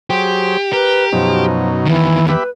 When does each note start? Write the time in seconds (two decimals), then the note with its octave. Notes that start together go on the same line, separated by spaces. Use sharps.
0.10 F#3 G4 G#4 C5
0.73 G4 A#4 B4
1.12 F#2 B2 F3 D#4
1.85 E2 D#3 E3
2.29 G4 B4 E5 B5